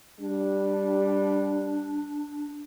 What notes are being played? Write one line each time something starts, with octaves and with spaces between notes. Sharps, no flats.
G3 D4